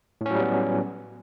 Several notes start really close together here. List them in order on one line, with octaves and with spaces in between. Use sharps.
A2 C#4 F#3 G3 B3